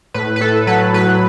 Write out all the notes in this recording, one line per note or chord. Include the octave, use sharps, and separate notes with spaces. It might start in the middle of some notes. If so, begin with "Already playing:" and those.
A2 B4
B4
A2 A4
F#3 B4
A2 B4